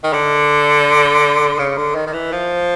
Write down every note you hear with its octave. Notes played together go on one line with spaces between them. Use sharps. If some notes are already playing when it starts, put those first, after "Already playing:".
D#3
D3
C#3
D3
D#3
D#3
E3
F3